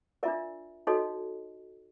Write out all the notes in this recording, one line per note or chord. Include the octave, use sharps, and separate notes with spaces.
D4 F4 A#4 D5 E5
D#4 F#4 A4 C#5 D#5